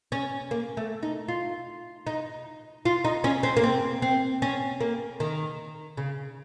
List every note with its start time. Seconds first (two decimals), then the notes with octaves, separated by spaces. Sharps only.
0.12 C#4
0.51 A#3
0.77 A3
1.03 D#4
1.28 F4
2.07 D#4
2.85 F4
3.05 D#4
3.24 C#4
3.43 C4
3.57 A#3
3.64 C4
4.02 C4
4.42 C#4
4.80 A#3
5.20 D#3
5.97 C#3